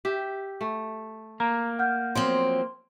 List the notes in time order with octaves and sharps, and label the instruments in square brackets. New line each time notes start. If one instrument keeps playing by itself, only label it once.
[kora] G4 E5
A3
[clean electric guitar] A#3 [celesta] A#5
[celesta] F#5 F6 G6
[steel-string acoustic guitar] F3 F#3 C4 [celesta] C6